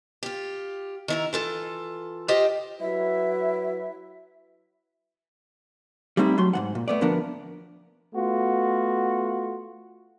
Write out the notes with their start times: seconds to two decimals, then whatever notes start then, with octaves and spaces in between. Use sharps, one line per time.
0.23 F4 G4
1.08 D#3 E4 A#5
1.33 E3 F4 A4
2.28 F4 G4 C5 D#5 G5
2.80 F#3 E4 B4 E5
6.17 G3 A3 C4 D#4 E4
6.38 F#3 A3 C6
6.53 G#2 D#3 F#5
6.75 A#2
6.88 A3 B3 D5
7.01 D2 F3 B3 D4 A#4
8.14 A3 B3 F4 F#4